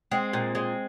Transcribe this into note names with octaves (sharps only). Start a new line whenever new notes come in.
G#3 C4
A#2
G#3